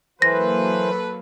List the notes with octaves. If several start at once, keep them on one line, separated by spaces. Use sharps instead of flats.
E3 F#3 A#3 A4 B4 C5 A#6